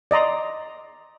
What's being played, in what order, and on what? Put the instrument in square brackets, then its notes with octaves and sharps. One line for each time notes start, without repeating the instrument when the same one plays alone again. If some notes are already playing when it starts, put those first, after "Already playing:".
[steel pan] D5 D#5 A#5 C6